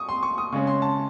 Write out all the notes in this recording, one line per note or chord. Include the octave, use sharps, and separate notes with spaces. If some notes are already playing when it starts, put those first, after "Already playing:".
Already playing: C#6 D#6
C6
C#6
D#6
C#3 G#3 C#4 C#6
C6
A5